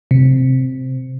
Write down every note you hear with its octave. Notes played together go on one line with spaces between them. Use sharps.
C3